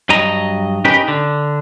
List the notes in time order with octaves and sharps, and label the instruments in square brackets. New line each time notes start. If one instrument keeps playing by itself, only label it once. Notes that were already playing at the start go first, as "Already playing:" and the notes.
[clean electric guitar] G2 F#3 D#5 A#5
C#4 D#4 G4 A#4 B4
D3